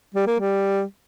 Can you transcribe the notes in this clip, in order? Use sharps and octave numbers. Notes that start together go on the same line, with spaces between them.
G3
A#3
G3